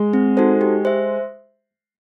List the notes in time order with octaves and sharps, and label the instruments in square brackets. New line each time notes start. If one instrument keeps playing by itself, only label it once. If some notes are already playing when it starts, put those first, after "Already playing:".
Already playing: [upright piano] G#3
[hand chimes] C4
D#4 F#4 A4 C5
G4
C5 E5